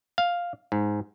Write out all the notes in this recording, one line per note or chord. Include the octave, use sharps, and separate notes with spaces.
F5
G#2